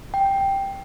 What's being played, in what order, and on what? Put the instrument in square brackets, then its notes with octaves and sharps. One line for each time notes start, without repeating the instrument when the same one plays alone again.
[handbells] G5